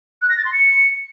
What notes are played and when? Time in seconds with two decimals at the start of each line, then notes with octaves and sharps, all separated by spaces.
0.22 F#6
0.30 A#6
0.37 A6
0.45 C6
0.53 C#7